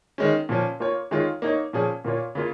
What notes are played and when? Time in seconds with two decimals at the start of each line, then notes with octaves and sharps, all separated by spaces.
0.18 D#3 G#3 C#4
0.49 A#2 F3 C#4
0.80 A#3 F4 C#5
1.11 D#3 G#3 F4 C#5
1.42 A#3 D#4 C#5
1.73 A#2 F3 C#4 G#4
2.05 A#2 A#3 F4 C#5
2.35 C#3 A#3 F4